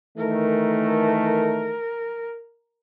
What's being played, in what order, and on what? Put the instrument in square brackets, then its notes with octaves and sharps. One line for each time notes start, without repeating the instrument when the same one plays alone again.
[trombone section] D#3 E3 A3 [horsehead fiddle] A#4